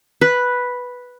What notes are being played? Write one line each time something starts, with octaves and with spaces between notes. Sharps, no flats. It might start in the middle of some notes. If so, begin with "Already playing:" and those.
B4